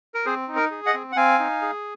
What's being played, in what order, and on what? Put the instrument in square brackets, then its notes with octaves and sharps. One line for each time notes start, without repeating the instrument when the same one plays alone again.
[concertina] A#4
C4 G#4 C5
D#4
A#4
G#4
D#5 F#5
C4
F#5
C4 F5 G#5
D#4
G#4